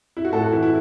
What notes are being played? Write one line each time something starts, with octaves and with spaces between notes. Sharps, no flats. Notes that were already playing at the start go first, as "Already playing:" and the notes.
E4
F#4
A2 A4
F#4
E3 E4
E4